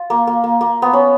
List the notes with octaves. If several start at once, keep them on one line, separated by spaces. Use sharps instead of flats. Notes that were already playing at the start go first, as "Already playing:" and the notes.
Already playing: F4
A#3
A#3
A#3
A#3
B3
C#4